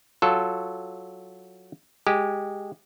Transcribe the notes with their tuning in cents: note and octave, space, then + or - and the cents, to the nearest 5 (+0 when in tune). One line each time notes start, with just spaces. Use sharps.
F#3 +0 F4 +0 A4 +0
G#3 -10 G4 +0